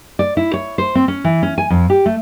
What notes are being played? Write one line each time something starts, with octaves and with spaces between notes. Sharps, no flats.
D5
E4
C#5
C5
C4
C#4
E3
C#4
G#5
F2
G4
A3